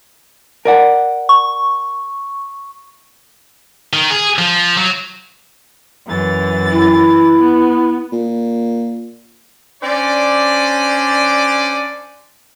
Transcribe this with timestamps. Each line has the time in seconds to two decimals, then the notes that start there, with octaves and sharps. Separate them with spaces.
0.65 A#4 D5 F#5
1.29 C#6
3.93 D#3
4.11 G#4
4.38 F3
4.77 F#3
6.07 F#2 E3 A6
6.70 E4
7.37 B3
8.12 A#2
9.82 C#4 D4 C5 D5